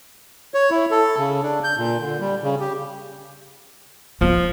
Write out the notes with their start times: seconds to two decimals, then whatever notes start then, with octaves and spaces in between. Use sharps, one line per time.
0.54 C#5
0.71 E4
0.91 A4
1.18 C#3
1.43 D4
1.64 G6
1.78 A#2
2.00 D3
2.20 G3
2.43 C#3
2.60 G4
4.21 F3 B3 F4